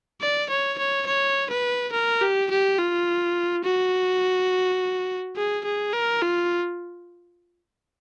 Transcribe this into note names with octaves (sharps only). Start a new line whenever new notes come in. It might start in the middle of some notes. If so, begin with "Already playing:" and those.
D5
C#5
C#5
C#5
B4
A#4
G4
G4
F4
F#4
G#4
G#4
A#4
F4